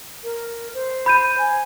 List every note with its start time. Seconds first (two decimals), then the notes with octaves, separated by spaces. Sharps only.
0.24 A#4
0.74 C5
1.06 B5 G6 D#7
1.38 G#5